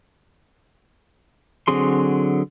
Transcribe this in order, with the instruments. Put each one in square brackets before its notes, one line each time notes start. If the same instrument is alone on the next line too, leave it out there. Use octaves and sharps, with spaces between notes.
[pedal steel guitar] D3 F#3 C4 G#4 C6